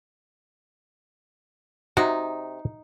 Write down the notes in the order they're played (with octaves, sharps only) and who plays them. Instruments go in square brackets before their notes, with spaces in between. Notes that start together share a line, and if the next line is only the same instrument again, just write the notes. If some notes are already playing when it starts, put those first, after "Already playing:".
[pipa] C3 [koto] D#4 [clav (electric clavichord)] F#4